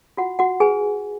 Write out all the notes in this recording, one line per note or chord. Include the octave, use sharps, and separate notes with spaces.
F4 F#4 F#5
F#4 F#5
G#4 B4 G#5